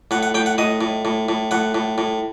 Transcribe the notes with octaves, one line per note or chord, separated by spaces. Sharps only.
A2 F#5
F#5
A2 G5
F#5
A2 D#5
A2
A2
A2
A2 F#5
A2
A2